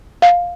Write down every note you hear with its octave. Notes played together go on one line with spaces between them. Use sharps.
F5